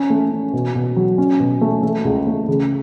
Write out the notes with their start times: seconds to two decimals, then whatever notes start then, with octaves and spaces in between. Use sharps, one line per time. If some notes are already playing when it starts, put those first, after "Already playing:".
Already playing: C#4
0.10 A3
0.31 C#4
0.53 B2
0.75 B2
0.96 F#3
1.18 C#4
1.40 B2
1.61 A3
1.83 A3
2.05 C#2
2.27 A3
2.48 C#3